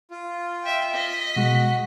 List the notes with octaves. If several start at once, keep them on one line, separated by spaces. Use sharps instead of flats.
F4
E5 G5
D#5 B6
B2 G#3 F#4